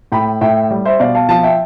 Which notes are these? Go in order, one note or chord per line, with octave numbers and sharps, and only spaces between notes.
A2 G5 B5
A2 E5 G5
G3
C5 E5
B2 D5 F5
F5 A5
F3 F5 A5
E5 G5